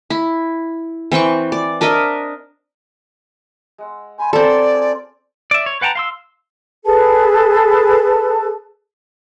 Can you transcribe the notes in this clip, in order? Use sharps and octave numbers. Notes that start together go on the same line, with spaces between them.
E4
E3 C4 G5 C#6
D5
D4 A#4 D#5 E5
G#3 F#5 E6
C5 G#5 B5 C6
C4 A4 A#4 D5 D#5 G#5
F#3 D6
D4 F4 G#4
D5 E5
C#5
B4 F#5 G5 A5 A#5
F5 C6 E6
G#4 A4 B4 A5